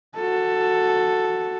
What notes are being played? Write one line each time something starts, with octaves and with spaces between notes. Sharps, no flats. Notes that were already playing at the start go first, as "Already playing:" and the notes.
F#4 A4